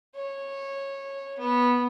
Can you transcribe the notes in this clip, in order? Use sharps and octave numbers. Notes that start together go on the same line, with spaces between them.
C#5
B3